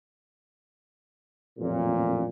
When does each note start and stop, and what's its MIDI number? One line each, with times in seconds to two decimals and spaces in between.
1.59 2.28 33
1.59 2.28 41
1.59 2.28 46